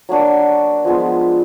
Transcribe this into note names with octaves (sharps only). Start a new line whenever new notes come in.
F#3 A#3 D4 F#4
F3 G#3 B3